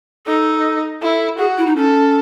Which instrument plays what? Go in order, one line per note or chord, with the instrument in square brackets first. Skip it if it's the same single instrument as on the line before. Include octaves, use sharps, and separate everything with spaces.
[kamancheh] D#4 [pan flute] A4
[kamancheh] E4 [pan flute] A4
[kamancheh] F#4 [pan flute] G#4
[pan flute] E4
D#4
[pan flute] C#4 [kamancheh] A4